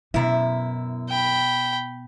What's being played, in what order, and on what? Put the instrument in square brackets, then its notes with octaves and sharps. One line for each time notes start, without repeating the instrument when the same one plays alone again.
[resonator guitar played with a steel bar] F#2 E4 [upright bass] B2
[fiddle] G5 B5